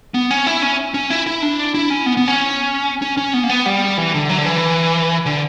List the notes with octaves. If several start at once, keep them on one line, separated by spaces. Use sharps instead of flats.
B3
C#4
E4
C#4
C#4
E4
E4
D4
E4
C#4
B3
B3
C#4
C#4
C#4
B3
A#3
B3
G3
E3
D3
F#3
D3
E3
D3